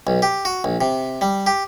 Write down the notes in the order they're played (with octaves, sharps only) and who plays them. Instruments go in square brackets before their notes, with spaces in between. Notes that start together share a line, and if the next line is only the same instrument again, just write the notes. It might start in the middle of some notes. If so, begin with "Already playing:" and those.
[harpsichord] B1
G4
F#4
A#1
C3
G3
G4